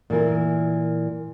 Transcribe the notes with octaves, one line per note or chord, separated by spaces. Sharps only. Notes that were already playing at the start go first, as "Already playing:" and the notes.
A#2 E3 A#4